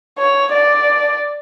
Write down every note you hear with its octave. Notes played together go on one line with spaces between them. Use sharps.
C#5
D5